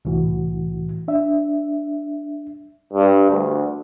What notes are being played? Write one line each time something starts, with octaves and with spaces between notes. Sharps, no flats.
C2 A2 E3 F#4
D4 E5
G2
D2